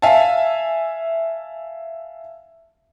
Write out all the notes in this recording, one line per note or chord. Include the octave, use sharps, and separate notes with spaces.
E5 F5 G#5 A5